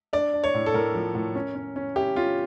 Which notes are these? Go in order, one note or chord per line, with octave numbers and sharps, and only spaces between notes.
D4 D5
D4
C#5
A2
A4
A2 A#4
F3
A2
C#4
C#4
C#4
E4 G4
C#4 F4